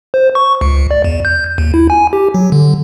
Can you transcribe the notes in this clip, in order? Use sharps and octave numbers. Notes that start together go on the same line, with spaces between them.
C5
C#6
C#2
D5
E2
G6
D#2
E4
G#5
G4
F#3
D3